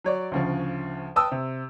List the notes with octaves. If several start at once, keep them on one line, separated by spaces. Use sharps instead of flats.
F#3 C#5 D5
D2 C#3 F3
B4 G5 A5 D#6 E6
C3